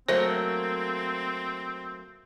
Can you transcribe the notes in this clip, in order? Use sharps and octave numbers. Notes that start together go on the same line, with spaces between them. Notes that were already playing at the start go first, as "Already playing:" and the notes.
F#3 A3 A#3 C4 C5